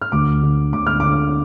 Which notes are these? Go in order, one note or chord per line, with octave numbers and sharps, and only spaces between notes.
F6
D2 D6
D3
D2 D6
F6
D3 D6